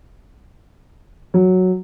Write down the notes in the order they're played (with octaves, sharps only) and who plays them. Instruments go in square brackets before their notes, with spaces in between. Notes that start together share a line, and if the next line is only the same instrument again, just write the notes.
[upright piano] F#3